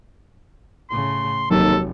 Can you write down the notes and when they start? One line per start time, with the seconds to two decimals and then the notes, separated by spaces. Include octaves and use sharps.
0.90 A2 C#3 C6
1.51 F1 D#2 F#3 A4